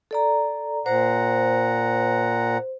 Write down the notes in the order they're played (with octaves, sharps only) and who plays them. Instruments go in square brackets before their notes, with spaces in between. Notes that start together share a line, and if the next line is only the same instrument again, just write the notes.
[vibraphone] A4 D5 A#5
[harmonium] A#2 F#5 A#5 [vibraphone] C5